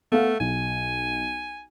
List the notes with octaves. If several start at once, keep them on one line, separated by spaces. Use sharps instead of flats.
A3 B3 A4 F5
B1 G#5